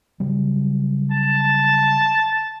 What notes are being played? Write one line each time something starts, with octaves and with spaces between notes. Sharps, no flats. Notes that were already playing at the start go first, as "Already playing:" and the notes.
C#3 F#3 G3
A5